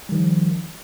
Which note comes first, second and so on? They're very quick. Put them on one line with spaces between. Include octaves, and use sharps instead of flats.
G3 D#3 F3